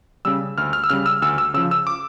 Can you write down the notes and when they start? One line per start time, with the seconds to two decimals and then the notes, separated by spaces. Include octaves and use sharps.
0.25 C#3 G3 E6
0.58 D2 F6
0.73 F6
0.84 E6
0.90 C#3 G3 F6
1.06 E6
1.22 D2 E6
1.38 E6
1.54 C#3 F3 E6
1.71 E6
1.87 D6